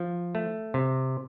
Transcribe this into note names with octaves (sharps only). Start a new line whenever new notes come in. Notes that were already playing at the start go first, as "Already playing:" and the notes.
Already playing: F3
A3
C3